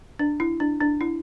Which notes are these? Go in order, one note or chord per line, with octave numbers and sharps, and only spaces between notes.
D4
E4
D4
D4
E4